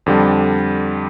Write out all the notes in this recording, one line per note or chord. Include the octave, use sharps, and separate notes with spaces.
F2 D3 G3